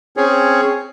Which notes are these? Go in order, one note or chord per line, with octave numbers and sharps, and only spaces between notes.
C4 C#4 G#4 C#5